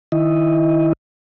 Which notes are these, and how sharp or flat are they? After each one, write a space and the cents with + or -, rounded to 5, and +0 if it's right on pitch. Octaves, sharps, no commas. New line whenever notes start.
D#3 +0 E4 +0 D#5 +0